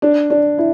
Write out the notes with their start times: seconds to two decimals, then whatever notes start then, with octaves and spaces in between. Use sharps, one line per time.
0.02 D4
0.30 D4
0.58 E4